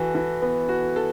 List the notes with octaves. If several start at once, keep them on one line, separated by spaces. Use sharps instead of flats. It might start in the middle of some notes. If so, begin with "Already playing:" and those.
Already playing: E3 F#4 A4
E3
B3
F#4
A4